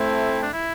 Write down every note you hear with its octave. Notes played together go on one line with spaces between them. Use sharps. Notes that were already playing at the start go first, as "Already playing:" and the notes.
Already playing: A3 C4 E4
D4
E4